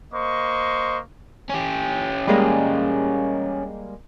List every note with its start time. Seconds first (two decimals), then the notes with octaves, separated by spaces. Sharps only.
0.13 A#3 C5 D#5 C#6
1.49 C#4 G4
2.27 G3 G#3 A#3